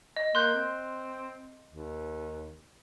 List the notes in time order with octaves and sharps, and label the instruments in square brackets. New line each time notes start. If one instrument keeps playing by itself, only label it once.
[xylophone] D#5
[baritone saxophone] A#3 [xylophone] C6 F#6 G6
[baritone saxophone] C4
D#2